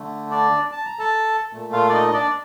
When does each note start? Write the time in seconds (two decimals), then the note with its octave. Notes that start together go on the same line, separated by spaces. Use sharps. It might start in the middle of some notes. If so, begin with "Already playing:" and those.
Already playing: D3 A3
0.30 D4 D5
0.72 A5
0.85 A#5
0.99 A4 A5
1.53 A#2 A3
1.73 F4 F5
1.89 D5
1.93 D#4 D#5
2.08 D#5
2.13 D4 D5